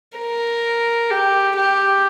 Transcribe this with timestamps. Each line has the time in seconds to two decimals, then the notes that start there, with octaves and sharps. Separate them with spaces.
0.19 A#4
1.11 G4
1.56 G4